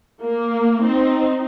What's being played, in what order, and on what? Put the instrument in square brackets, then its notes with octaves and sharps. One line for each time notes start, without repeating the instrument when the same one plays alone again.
[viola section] A#3
C4 D#4